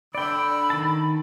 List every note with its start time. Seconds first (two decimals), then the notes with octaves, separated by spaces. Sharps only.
0.15 D3 D5 G5 B5 E6
0.70 D#3 A5